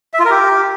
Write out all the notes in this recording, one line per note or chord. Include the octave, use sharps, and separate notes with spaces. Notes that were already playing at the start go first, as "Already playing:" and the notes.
E5
F4
A#4
G4